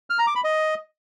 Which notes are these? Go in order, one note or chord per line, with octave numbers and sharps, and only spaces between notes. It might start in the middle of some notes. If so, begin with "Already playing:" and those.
F6
A#5
D6
B5
D#5